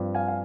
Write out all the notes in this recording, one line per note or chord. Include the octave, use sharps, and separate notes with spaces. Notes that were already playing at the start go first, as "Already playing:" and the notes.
Already playing: G2 F3 C4
F5 G#5
F5